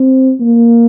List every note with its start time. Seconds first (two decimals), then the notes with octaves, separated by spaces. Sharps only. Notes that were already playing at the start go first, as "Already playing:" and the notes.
Already playing: C4
0.40 A#3